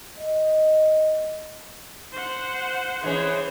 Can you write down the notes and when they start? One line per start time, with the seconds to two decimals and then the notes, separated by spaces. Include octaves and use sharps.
0.19 D#5
2.12 C5 F#5
3.03 E3 C#4 G#4 C5